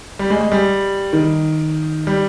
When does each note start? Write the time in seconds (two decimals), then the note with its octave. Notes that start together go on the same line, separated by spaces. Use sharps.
0.19 G3
0.30 G#3
0.41 G#3
0.52 G3
1.13 D#3
2.07 G3